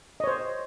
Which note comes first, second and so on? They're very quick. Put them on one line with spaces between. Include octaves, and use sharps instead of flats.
D#5 C#5 C5